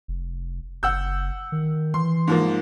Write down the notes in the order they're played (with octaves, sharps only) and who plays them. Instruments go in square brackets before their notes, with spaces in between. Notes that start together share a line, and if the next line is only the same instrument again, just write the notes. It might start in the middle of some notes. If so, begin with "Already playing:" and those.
[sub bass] F1
[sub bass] F#1 [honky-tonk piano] F#5 E6 G6
[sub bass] D#3
[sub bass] E3 [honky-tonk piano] C6
[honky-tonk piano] G#2 F3 A#3